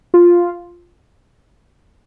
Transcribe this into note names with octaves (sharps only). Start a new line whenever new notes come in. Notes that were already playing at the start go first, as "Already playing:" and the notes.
F4